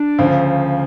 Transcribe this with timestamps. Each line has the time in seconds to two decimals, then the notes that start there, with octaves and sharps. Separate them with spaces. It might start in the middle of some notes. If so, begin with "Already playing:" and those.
Already playing: D4
0.19 D2 C#3 F3